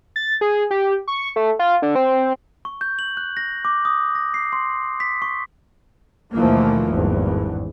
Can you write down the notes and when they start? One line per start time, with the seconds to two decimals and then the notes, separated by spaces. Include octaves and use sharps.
0.16 A6
0.41 G#4
0.71 G4
1.08 C#6
1.36 A3
1.59 F4
1.82 D3
1.95 C4
2.65 C#6
2.81 G6
2.99 F#7
3.17 F#6
3.37 A#6
3.65 D6
3.85 D#6
4.15 A#6
4.34 C7
4.53 C6
5.00 B6
5.22 C#6
6.34 D#2 B2 E3 F3 A3 A#3
6.91 G#1 E2 G2